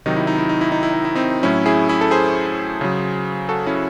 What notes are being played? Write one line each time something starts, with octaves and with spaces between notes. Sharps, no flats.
C3 D#3 F#3 D#4
E4
D#4
E4
D#4
E4
D#4
E4
D#4
E4
C4 D#4
A2 F#3 C#4 E4
E4 G#4
E4 G#4
A4
G#4 C5
C#3 F#3
F#4 A4
C#4 E4